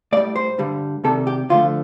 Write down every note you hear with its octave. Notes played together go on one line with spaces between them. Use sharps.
A2 G3 D5
C5
G2 D3 G3
C2 C3 D#3 G3 A4
G4
D2 D3 F3 A3 F4